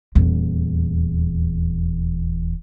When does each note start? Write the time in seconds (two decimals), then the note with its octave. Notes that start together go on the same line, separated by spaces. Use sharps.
0.15 D#1 E2